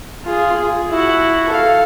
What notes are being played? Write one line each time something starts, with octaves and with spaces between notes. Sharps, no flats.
F4 G#4
G#4
E4 F#4
A4 F5